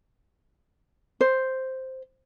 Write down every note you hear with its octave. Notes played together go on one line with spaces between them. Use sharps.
C5